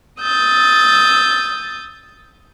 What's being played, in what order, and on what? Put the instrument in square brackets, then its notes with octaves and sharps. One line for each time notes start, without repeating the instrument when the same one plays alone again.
[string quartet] D#6 E6 G6 A6